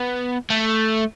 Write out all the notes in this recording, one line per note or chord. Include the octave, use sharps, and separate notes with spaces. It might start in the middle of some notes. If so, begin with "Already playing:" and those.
Already playing: B3
A3